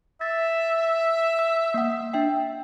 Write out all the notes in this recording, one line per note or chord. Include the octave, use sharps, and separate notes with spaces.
E5 A6
E6
A#3 F#5
D4 E5 G5